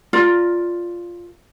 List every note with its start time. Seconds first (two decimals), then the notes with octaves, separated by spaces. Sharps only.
0.13 F4 A#4 D5